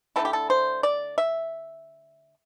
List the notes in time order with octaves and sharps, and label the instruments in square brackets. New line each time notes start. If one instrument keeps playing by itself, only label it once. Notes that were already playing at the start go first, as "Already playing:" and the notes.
[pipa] D3 A3 C4 E4 A4
G4
A4
C5
D5
E5